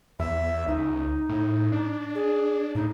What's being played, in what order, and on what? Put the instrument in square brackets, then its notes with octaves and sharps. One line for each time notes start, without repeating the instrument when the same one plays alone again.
[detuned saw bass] E2 [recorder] E5
[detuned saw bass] C#2 [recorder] D#4
[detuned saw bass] A2
D4
[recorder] G#4
[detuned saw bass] A2 [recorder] D#4